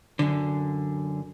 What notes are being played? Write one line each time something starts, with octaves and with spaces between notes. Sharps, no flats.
F#2 D3